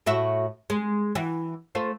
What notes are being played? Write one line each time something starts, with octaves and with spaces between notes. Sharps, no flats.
A2 F#4 E5
G#3
E3 F#4
A3 F4 C5